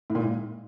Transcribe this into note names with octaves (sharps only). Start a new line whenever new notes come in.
A2
A#2
G#2